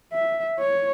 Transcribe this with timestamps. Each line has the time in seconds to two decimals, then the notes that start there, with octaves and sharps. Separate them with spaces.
0.13 E5
0.59 C#5